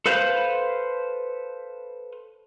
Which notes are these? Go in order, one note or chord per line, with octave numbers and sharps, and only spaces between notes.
A4 B4 C5 F5 G6